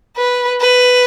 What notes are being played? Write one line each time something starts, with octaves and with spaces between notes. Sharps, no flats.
B4
B4